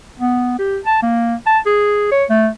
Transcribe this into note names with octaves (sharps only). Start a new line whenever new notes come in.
B3
G4
A5
A#3
A5
G#4
C#5
A3